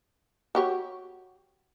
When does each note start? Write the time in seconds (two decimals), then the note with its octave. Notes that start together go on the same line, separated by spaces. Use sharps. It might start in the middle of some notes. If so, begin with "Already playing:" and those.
0.55 F#4 G4 C#5